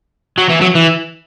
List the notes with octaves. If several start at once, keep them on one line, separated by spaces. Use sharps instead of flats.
F#3
E3
F#3
E3